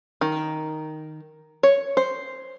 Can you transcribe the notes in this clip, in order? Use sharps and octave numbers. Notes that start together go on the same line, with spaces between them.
D#3
C#5
C5